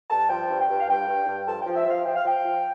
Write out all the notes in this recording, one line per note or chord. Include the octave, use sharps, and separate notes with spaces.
G2 A5
F3 G5
G2
G5
G2
F5
G2 G5
G2
G2
F3 A5
F3 G5
E5
F3 F5
F3 G5
F5
F3 G5
F3